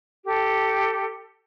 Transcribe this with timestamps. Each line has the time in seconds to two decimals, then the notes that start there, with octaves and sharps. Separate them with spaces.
0.25 G4 A4